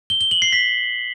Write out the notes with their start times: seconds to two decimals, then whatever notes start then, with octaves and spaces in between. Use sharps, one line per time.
0.10 G7
0.21 G7
0.31 F#7
0.42 C7
0.53 B6